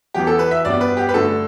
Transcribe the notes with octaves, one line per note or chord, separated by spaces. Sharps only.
E2 E3 B3 G4
A4
B4
E5
G2 G3 B3 D5
B4
G4
B4
G2 D3 A3 A4